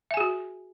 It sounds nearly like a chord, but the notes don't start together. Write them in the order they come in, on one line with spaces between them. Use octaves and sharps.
E5 G#5 G#4 F#4